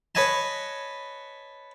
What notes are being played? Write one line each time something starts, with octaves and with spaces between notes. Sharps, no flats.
B4 C#5 D#5 G#5 A5